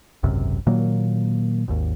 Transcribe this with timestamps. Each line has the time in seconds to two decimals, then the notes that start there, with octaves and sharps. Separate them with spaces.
0.23 G#1 C#2 F#2 C3
0.67 A#2 D#3 F#3 A#3
1.68 G#1 D#2